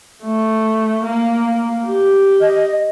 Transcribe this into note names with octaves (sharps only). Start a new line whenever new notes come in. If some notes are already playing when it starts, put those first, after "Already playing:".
A3
A#3
G4
D#5